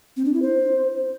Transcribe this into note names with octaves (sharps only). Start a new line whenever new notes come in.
C4
D4
E4
C5